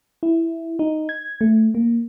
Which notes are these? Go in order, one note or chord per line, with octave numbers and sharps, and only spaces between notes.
E4
D#4
G#6
A3
A#3